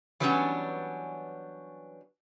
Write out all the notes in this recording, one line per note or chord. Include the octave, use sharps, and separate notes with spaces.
E3 F#3 G3 B3 C#4 D4